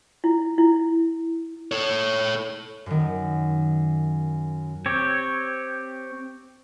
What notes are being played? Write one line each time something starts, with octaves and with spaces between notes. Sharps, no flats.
E4
E4
A4 C#5
F#2 D#3
C4 G4 C#5